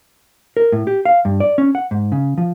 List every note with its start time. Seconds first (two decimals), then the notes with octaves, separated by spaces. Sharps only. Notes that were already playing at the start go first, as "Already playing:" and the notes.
0.57 A#4
0.72 A2
0.87 G4
1.05 F5
1.25 G2
1.40 D5
1.58 C#4
1.75 F#5
1.91 G#2
2.12 C#3
2.38 F3